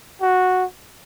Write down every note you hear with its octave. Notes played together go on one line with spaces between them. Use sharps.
F#4